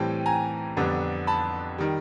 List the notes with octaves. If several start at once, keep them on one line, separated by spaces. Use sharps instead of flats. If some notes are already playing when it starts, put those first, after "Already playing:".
Already playing: A2 E3 G3 C4 G5 A5
G#5 A#5
F2 D3 G3 B3 D4
A5 B5
D#3 G3